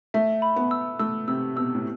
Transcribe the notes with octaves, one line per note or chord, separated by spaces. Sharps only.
A3 E5
B5
B3
E6
A3 E6
C3 E6
B2 E6
A2